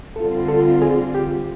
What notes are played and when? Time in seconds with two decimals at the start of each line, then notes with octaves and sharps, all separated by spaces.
0.16 D3 G3 C4 F4 A4
0.48 A4
0.82 G#4
1.15 G4